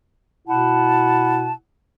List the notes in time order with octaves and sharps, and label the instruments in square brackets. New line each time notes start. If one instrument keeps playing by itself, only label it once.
[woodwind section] B2 E4 F#5 A5